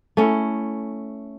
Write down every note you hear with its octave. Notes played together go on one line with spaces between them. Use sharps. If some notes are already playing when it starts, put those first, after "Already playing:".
A3 C#4 E4